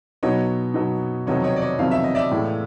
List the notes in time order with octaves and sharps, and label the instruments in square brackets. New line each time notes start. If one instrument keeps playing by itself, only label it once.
[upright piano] B2 F#3 B3 D#4 [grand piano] C#5 D#5
[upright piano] B2 F#3 B3 D#4
[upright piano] F2 C3 D#3 F#3 B3 [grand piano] C#5 D#5
[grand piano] C#5 D#5
D5
C#5 D#5
[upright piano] F2 C3 D#3 F#3 B3 [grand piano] F5
[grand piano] E5
D#5
D5 E5
[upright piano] A2 E3 G#3